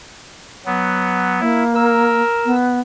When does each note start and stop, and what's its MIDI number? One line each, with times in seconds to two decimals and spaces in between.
0.66 1.40 54
0.66 1.40 59
1.40 2.22 58
1.40 1.64 64
1.75 2.55 70
1.75 2.55 88
2.45 2.80 59